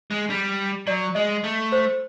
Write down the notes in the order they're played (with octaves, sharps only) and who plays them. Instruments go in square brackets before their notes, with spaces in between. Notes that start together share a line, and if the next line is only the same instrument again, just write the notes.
[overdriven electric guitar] G#3
G3
[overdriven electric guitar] F#3 [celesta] D5
[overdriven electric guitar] G#3 [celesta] D#5
[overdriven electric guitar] A3
[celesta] C5